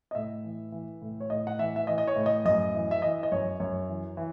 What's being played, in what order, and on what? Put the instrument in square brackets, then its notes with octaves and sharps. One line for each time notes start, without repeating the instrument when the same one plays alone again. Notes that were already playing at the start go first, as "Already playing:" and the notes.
[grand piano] D#5
A2 E5
E3
E3
A2
C#5
A2 D#5
F#5
E3 E5
E5
E3 D#5
D#5
C#5
A2
D#5
F#2 D#5
E3
E5
E3 D#5
D#5
F#2 C#5
F#2 C#5
E3
E3